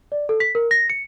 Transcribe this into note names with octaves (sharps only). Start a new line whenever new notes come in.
D5
A4
B6
A#4
A#6
C#7